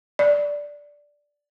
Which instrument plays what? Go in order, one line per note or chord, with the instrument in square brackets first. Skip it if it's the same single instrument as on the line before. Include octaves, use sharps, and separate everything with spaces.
[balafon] D5